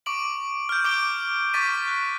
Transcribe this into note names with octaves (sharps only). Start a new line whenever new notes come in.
C#6 D6 D7 F#7
F6 G6
D6 D7 G7
C#6 D6 A6 B6 D#7
F#6